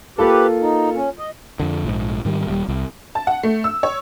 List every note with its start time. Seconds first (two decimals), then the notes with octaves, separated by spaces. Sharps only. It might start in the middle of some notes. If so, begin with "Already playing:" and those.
0.18 A#3 F4 G4 A4 B4
0.62 D#4
0.96 C#4
1.19 D#5
1.60 F2 D3
1.85 A#1 G#2
2.25 G#2 D#3 G3
2.47 D#1 G3
2.68 C2
3.15 A5
3.27 F#5
3.43 A3
3.64 E6
3.83 C#5